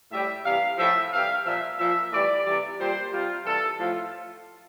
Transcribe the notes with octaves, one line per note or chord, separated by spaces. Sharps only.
A2 G3 E5
C3 E3 G3 F5
A2 F3 E5
C3 E3 G3 F5
A#2 F3 E5
A#2 F3 E5
A2 E3 G3 D5
C3 E3 G3
A#2 G3 C5
C3 G3 F4
C3 E3 G3 A4
A2 F3 F4